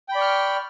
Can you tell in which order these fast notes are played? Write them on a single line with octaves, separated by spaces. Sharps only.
G5 B5 D5 C#6 F6